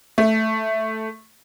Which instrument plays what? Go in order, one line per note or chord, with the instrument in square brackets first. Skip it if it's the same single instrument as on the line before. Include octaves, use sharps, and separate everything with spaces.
[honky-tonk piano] A3